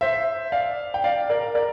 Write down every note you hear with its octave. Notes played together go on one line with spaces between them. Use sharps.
C5 E5
D5 F5
G5
D5 F5
A#4 D5
A#4 D5